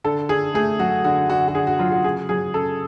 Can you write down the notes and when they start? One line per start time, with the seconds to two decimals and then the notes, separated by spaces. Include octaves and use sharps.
0.04 D3 A4
0.29 D3 G#4
0.54 A3 G#4
0.79 F#3 F#4
1.04 D3 F#4
1.29 D3 F#4
1.48 F#4
1.54 D3 G#4
1.67 F#4
1.79 F#3 F4
1.92 F#4
2.04 C#3 G#4
2.29 F#3 G#4
2.54 C#3 A4